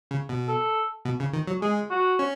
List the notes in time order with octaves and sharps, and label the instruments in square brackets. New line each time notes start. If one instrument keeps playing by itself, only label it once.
[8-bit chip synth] C#3
B2
[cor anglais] A4
[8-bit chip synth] B2
C#3
D#3
F#3
[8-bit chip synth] G#3 [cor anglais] G#4
[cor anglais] F#4
[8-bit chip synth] C#4